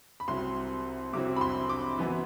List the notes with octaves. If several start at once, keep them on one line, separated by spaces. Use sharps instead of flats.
B5
C2 C3 F#3 C4 E4 C6
C2 C3 F#3 C4 E4 D6
B5
C6
D6
F#2 E3 B3 E4